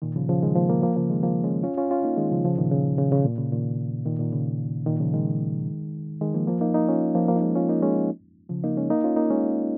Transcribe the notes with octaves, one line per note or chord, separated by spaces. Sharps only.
A#2 D#3
C#3 F3
C#3 F3
D#3 G#3
F3 A#3
F3 A#3
F3 A#3
C#3 F3
D#3 G#3
F3 A#3
G#3 C#4
C#4 F4
C#4 F4
C#4 F4
A#3 D#4
D#3 G#3
C#3 F3
C#3 F3
A#2 D#3
C#3
C#3
C#3
A#2
C#3
A#2 D#3
A#2 D#3
A#2 D#3
C#3
A#2 D#3
C#3 F3
D#3 G#3
D#3 G#3
F3 A#3
F3 A#3
A#3 D#4
A#3 D#4
C#4 F4
F3 A#3
F3 A#3
D#4
G#3 C#4
C#4 F4
A#3 D#4
G#3 C#4
C#3 F3
A#3 D#4
G#3 C#4
A#3 D#4
C#4 F4
A#3 D#4
G#3 C#4